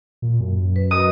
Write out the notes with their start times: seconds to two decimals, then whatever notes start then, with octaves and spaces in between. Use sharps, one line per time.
0.22 A#2
0.40 F#2
0.76 B4
0.91 F#4 A#4 D#5 D#6